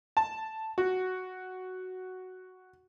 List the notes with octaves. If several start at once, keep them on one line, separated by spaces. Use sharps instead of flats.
A5
F#4